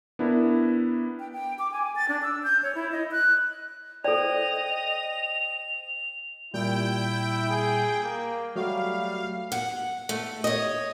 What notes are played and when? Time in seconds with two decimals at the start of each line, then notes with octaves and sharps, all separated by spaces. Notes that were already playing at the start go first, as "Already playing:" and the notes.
0.19 B3 D4 E4 A#4
1.19 G5
1.33 G5
1.59 D6
1.72 G#5
1.96 A6
2.09 D4
2.23 E6
2.43 G6
2.63 C#5
2.75 E4
2.92 D#5
3.12 F#6
4.04 A4 C5 D5 D#5 G5 F7
6.54 A#2 G3 E4 G5
7.49 G#4
8.03 A#3
8.56 F#3 G3 A3 F#4 F5
9.52 F#5
10.09 A3
10.44 C#5 D#5